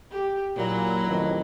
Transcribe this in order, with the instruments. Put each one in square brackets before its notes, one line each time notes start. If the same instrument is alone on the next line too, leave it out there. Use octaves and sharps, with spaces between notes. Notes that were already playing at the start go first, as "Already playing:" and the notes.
[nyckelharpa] G4
[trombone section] A#2 [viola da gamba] F#3 [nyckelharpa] E4 A#5
[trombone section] A1 F2 D#3